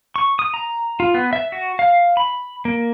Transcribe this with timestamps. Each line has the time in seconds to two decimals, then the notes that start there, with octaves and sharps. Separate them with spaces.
0.16 C#6
0.39 D#6
0.54 A#5
1.00 F4
1.14 B3
1.33 E5
1.52 F#4
1.79 F5
2.17 B5
2.65 A#3